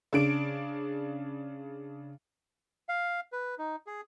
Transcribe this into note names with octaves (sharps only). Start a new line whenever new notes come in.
C#3 D4 D7
F5
B4
D#4
G#4